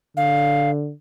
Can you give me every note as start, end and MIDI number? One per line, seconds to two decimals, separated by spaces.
0.17 0.92 50
0.17 0.70 77